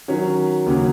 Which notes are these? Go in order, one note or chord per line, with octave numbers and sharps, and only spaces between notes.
D#3 F#3 C#4
D#2 C#3 F#3